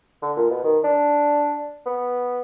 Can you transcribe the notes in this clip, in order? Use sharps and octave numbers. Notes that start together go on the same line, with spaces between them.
D3
A#2
B2
D#3
D4
B3